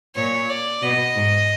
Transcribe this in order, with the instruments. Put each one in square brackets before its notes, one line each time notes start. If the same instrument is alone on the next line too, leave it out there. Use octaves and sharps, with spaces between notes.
[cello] A#2 [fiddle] C#5
[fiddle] D5
[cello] B2 [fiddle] D#5
[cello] G#2